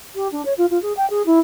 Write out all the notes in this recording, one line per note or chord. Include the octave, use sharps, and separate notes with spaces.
G4
D4
C#5
F4
F4
G#4
G5
G#4
E4